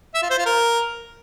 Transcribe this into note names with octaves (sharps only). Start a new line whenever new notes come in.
E5
F4
C5
F4
A#4